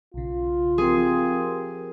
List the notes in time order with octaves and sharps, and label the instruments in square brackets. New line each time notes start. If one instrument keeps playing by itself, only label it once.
[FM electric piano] B1 C#3 [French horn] F4
[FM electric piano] F3 G4 A#4 [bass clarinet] C4 [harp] G#4